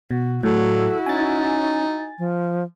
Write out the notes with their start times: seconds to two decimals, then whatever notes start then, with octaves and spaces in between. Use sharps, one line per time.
0.11 B2 F#4
0.43 A2 F#3 E4 F#4 A4
1.06 C#4 D#4 G#5 A6
2.18 F3